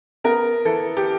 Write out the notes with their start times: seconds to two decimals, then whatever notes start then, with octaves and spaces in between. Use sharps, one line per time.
0.24 B3 A#4
0.65 E3 A4
0.97 G4